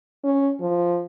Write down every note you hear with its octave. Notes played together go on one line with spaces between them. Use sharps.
C#4
F3